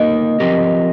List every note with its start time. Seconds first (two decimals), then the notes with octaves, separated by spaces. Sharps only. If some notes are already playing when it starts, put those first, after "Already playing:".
Already playing: A#3 D#4 A#4 D#5
0.40 F3 C4 G4 A#4